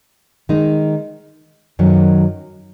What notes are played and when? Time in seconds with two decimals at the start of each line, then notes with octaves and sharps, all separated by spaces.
0.49 D#3 G#3 D#4
1.79 F#2 D#3 F#3